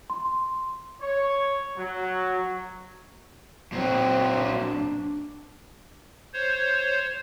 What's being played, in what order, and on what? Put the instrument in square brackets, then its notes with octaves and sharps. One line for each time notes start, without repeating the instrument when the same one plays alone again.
[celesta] C6
[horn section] C#5
F#3
[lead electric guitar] A#2 F#3 [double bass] C4
[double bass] D4
[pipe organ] C5 C#5